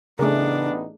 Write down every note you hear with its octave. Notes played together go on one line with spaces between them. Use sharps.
A1 C#3 A3 B3 D4 D#4 G#4 A#4